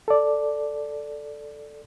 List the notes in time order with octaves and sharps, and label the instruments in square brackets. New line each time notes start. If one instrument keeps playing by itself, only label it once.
[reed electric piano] A4 D5